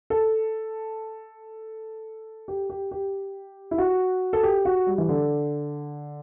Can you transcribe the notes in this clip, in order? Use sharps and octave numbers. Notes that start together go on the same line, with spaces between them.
A4
G4
G4
G4
E4
F#4
A4
G4
F#4
G3
E3
D3